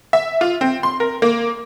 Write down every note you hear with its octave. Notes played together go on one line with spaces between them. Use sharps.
E5
F4
C4
C6
A#4
A#3